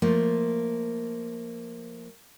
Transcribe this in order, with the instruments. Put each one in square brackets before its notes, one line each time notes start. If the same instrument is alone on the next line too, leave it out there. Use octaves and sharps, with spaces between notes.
[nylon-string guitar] F3 A3 A#3 F4